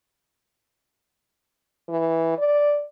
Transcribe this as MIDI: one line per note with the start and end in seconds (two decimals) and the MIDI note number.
1.89 2.36 52
2.38 2.83 74